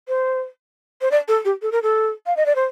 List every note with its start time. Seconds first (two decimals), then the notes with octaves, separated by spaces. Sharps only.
0.08 C5
1.01 C5
1.11 D5
1.28 A4
1.45 G4
1.62 A4
1.72 A#4
1.83 A4
2.26 F5
2.37 D#5
2.46 D5
2.55 C5